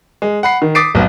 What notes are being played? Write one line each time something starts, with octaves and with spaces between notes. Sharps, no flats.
G#3
F#5 B5 C7
D#3
D6 D#6 A6 B6 C7 D7
F1 B1 B3 D#5